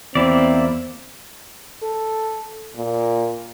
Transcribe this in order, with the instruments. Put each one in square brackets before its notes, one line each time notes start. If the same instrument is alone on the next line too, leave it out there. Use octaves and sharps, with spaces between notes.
[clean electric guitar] E2 [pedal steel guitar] A#3 E4 D5 [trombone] C4
[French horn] A4
A#2